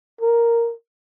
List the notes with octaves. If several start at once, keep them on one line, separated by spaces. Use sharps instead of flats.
A#4